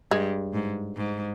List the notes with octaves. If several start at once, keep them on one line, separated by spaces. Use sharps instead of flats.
G2 G#3
G#2
G#2